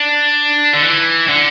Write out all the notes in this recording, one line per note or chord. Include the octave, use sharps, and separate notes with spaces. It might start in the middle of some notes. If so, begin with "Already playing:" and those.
Already playing: D4
D3
E3
D3